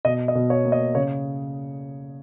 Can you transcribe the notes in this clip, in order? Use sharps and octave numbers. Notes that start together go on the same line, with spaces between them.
B2 D#5
D#5
B2
C#5
A#3
D#5
C#3 C#5